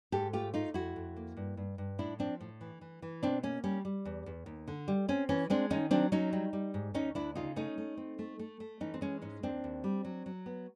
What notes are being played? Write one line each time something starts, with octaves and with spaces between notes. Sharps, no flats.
G#2 G4 A4
A3 F4 G4
A3 D#4 F4
F2 E4 F#4
F2
A#3
G2
G2
G2
A2 D4 E4
F3 C4 D4
A2
E3
E3
E3
B2 C4 D4
A#3 C#4
G3 C#4
G3
E2
E2
D#2
D3
G3
C4 C#4
E3 C#4
G#3 C4 D4
D#3 C#4 D#4
F#3 C4 D4
F#3 C#4 D#4
G3
G3
G#2
D2 C#4 D#4
D2 D4 E4
C#3 D#4 F4
A3 C#4 D#4
A3
C4
A3
A3
A3
E3 C#4 D#4
C4
G#3 C#4
G#2 C#4
D#2 C4 D4
D#2
G3
F#3
F#3
B3